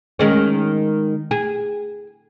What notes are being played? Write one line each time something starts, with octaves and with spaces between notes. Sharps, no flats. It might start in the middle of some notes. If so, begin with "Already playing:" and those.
D#3 G#3 C#4
G#4